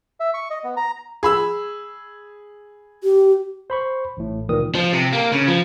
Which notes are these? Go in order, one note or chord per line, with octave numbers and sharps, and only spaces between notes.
E5
C#6
D#5
B3
A#5
G#4 B5 E6
G4
C5 B5 C#6
A1 A2
C#2 A#2 D#3 E3 A#4 D#6
F3
C3
A#3
C#3
F3